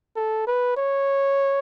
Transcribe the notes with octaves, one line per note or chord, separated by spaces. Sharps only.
A4
B4
C#5